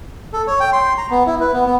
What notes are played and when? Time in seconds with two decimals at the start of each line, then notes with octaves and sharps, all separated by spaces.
0.33 A4
0.47 C#5
0.60 G5
0.73 C6
0.97 A#5
1.10 B3
1.26 E4
1.41 B4
1.53 B3
1.66 B3